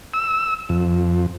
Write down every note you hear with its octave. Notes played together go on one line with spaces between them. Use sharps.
E6
F2